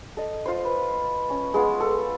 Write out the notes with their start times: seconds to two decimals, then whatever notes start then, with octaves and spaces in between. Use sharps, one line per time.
0.17 A4 D#5
0.46 F4 C5
0.65 B4
1.30 C#4
1.54 G#3 B3 F4
1.80 A4